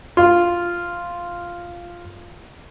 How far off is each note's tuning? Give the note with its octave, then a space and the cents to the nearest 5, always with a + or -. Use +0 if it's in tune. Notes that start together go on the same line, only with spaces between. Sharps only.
F4 -5